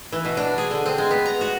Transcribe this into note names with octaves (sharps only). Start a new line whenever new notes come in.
E3
B2
D4
G#4
D3
C4
G#3
B3
A#5
F#4